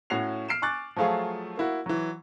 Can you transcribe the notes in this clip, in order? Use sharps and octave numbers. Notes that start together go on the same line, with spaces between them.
A2 C#4 F#4 C7 F7
F6 C7 D7 E7
G#5 C#6 D6 F#6 A6
F3 F#3 A3 F4 G#4
A#3 E4 F#4
E3 F#3